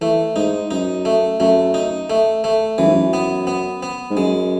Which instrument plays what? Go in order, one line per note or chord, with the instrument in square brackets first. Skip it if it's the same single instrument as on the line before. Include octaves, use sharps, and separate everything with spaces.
[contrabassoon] E3 [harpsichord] A3
[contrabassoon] G#2 [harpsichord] D#4
[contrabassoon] F#2 [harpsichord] D#4
[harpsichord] A3
[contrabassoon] F#2 [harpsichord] A3
[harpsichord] D#4
A3
A3
[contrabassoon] F#2 [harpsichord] E3
[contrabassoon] G#2
F#2
[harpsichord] B3
B3
B3
[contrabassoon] G#2
[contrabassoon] F#2 [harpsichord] G#3